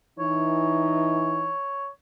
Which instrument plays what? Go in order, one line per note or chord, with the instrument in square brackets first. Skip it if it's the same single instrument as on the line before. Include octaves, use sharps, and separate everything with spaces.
[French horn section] E3 D#4 [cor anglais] C#5